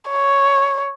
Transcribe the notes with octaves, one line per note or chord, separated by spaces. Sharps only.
C#5